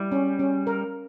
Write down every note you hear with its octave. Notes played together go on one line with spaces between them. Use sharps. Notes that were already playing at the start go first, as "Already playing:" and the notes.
Already playing: G3 E4
C#4
C#4
A#4